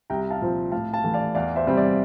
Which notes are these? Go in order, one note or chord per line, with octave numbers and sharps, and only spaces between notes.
C2 G5 A#5
F5 A5
A#2 F3 C4
A2 F5 A5
F5 A5
E3 A3
D5 F5
E2 D5 F5
C5 E5
C3 G3 C4
D5